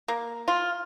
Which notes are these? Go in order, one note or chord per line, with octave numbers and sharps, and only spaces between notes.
A#3
F4